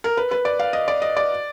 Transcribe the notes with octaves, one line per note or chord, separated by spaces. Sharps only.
A#4
B4
B4
D5
F5
D#5
D5
D#5
D5